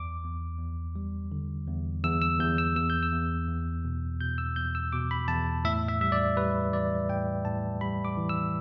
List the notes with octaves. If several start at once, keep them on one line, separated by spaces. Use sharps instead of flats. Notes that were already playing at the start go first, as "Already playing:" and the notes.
Already playing: E2 D6
E2
E2
G3
D3
E2
E2 E6
E6
E2 G6
E6
E2 E6
G6
E6
E2
E2
B2
B2 G6
E6
E2 G6
E6
B2 D6
B5
E2 A5
A2 E5
E5
G3 E5
D5
G3 B4
E3 D5
A2 G5
A2 A5
G3 B5
D6
E3
E6